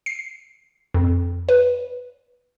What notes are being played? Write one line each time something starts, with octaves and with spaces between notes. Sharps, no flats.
C7
F2
B4